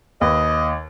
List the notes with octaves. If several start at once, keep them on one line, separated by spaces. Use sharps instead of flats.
D#2 B4 D#5